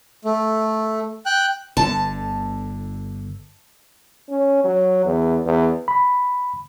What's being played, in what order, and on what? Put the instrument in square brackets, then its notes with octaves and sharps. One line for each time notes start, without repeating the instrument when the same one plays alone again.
[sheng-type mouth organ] A3
G5 F#6
[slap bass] G1 D3 [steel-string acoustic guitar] A5
[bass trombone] C#4
F#3
E2
E2
[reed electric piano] B5